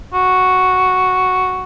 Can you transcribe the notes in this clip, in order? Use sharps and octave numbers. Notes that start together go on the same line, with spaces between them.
F#4